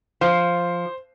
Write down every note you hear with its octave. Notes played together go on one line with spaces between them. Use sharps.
F3 C5